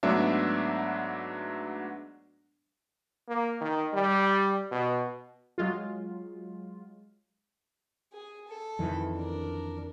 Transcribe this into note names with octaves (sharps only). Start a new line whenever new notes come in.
G#2 F#3 A3 B3 D4 E5
A#3
D#3
G3
B2
F#3 G#3 F4
G#4
A4
F2 D#3 E3
D4 A#4